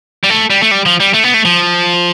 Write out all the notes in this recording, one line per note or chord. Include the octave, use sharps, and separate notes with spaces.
G3
A3
G3
A3
G3
F3
G3
A3
B3
A3
F3